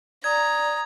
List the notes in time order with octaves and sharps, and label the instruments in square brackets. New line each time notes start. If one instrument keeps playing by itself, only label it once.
[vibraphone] D5 [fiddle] A#5 [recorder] D#6 [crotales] G#6